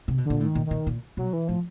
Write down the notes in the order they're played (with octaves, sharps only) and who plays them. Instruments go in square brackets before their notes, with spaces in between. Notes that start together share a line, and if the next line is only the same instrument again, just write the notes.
[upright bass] C3
B2
[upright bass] A#2 [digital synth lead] D3
[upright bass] A2
[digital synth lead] D#3
[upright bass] A#2
[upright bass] A#2 [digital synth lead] D#3
[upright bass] A#2
[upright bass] B2 [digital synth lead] F#3
[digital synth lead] E3
[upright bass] A2 [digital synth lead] F3